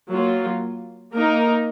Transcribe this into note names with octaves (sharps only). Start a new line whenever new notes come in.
F#3 A#3 F4
A#3 D#4 A#4